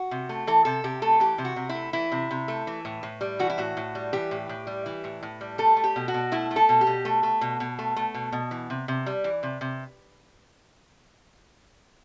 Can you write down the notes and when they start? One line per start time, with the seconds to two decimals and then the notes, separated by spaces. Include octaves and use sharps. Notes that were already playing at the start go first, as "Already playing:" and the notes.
Already playing: F#4
0.11 C3
0.29 A3
0.47 E3 A4
0.65 C3 A4
0.84 C3 G4
1.02 A3 A4
1.20 E3 G4
1.38 C3
1.45 F#4
1.56 C3
1.69 E4
1.75 A3
1.93 E3 E4
2.12 C3
2.31 C3
2.48 A3
2.67 E3
2.85 A2
3.03 A2
3.21 G3
3.39 E3 F#4
3.50 E4
3.58 A2 F#4
3.77 A2
3.95 G3
4.13 E3 G4
4.31 A2
4.49 A2
4.67 G3
4.86 E3
5.04 A2
5.23 A2
5.41 G3
5.58 A3 A4
5.76 A3
5.84 G4
5.96 B2
6.08 F#4
6.14 B2
6.32 A3 E4
6.51 A3
6.56 A4
6.69 B2
6.81 G4
6.87 B2
7.05 A3
7.23 A3
7.41 B2
7.60 B2
7.79 A3
7.96 A3
8.14 B2
8.32 B2
8.51 E3
8.70 C3
8.88 C3
9.06 G3
9.24 E3
9.43 C3
9.61 C3